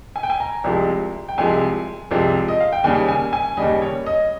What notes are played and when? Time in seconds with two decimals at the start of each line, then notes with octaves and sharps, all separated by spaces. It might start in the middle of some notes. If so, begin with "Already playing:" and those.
0.16 G#5
0.23 G5
0.30 G#5
0.40 A#5
0.64 C2 C3 F3 G#3
1.29 G5
1.38 C2 C3 F3 G#3 G#5
2.11 C2 C3 F3 G#3
2.48 D#5
2.60 F5
2.72 G5
2.84 D#2 C#3 G3 G#5
3.08 G#5
3.33 G#5
3.57 D#2 C#3 G3 D#5
3.82 C#5
4.06 D#5